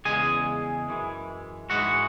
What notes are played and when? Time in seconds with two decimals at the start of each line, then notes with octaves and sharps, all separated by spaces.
0.05 E2 C#3 G#3 G#4 G#5
0.88 F#2 E3 G#3
1.70 G#2 E3 G#3 F#4 F#5